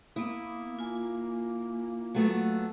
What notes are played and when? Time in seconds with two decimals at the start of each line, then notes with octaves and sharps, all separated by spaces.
0.16 A#3 B3 E4 D#6
0.79 F4 G#5
2.14 F#3 A3 B3